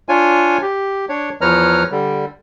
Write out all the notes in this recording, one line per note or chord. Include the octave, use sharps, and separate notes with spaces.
D4 F4 C#5 G#5
G4
D4 C#5
E2 F3 B4 C#5 A#5 F6
D3 G3